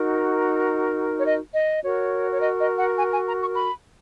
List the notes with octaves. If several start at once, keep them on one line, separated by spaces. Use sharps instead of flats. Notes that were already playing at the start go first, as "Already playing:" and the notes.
Already playing: D#4 F#4 A#4
C#5
D#5
D#5
F#4 A#4 C#5
C#5
D#5
D#5
F#5
G#5
G#5
A#5
C#6
B5